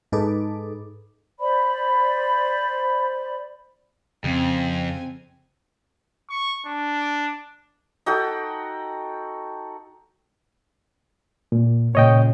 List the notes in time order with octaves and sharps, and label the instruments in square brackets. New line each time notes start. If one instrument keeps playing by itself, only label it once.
[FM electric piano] G#2 D#4 G#4 A4 B4 D6
[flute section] C5 D5 B5
[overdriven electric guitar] F2 [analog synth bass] C#3 [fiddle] C4 G#5
[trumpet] C#6
D4
[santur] D#4 F#4 A4 G5
[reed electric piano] A#2
[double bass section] A#2 C#3 [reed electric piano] C#5 D#5 G5